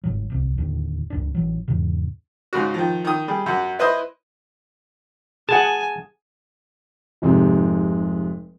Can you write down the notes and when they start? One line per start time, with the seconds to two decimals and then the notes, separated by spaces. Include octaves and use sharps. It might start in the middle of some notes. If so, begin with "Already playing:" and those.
0.04 G1 G#2 F#3
0.30 D1 C2
0.58 D1 D#2 A2 D3
1.10 C#2 G2 D4
1.35 A1 E3 F#3
1.68 E2 G#2 C#3
2.53 G#2 C#3 F#4
2.74 D#3 F3
3.05 D#3 D#6
3.28 G3 G#4
3.46 F#2 F#5
3.79 E4 B4 C5 D#5 D#6
5.49 G#4 F#5 G#5 A5
7.22 F1 G#2 C3